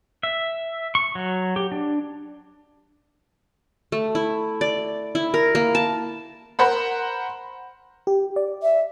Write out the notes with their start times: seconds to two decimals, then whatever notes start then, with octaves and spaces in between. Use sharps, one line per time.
0.23 E5
0.95 C#6
1.15 F#3
1.56 G4
1.72 D4
3.92 A3
4.15 E4
4.61 D5
5.15 E4
5.34 A#4
5.55 A#3
5.75 A5
6.59 A#4 C5 F#5 B5
8.07 G4
8.36 D5
8.63 E5